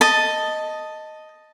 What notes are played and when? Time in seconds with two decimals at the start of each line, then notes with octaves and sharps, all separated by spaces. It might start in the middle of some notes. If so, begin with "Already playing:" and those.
0.01 D#5 A5